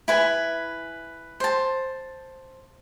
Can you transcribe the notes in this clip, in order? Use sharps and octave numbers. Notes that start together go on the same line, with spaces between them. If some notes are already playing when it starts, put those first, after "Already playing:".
E4 B4 G#5
C5 A5